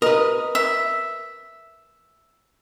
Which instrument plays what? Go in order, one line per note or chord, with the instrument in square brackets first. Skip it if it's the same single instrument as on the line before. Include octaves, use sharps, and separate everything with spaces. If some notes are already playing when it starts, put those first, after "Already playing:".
[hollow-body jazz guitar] A#4 B4 [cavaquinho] D#5
[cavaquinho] E5